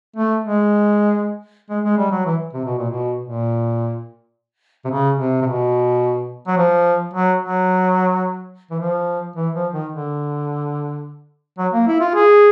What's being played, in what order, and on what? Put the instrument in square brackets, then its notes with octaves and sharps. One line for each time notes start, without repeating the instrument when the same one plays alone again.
[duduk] A3
G#3
G#3
G#3
G3
F#3
E3
C3
B2
A#2
B2
A#2
C3
C#3
C3
C3
B2
F#3
F3
F#3
F#3
E3
F3
E3
F3
D#3
D3
F#3
A#3
E4
F4
G#4